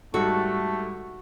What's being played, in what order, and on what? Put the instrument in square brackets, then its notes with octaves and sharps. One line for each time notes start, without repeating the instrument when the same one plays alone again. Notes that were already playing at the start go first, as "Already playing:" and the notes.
[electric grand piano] G#2 G3 [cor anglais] A3 [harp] F#4 [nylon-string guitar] A4